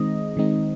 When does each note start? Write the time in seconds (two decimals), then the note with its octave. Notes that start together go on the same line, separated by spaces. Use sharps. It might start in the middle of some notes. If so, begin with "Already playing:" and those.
Already playing: D#3 G#3 C4 D#4 D#5
0.37 D#3 G#3 C4 D#4